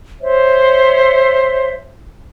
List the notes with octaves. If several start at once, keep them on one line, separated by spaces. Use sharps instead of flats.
C5 C#5 E5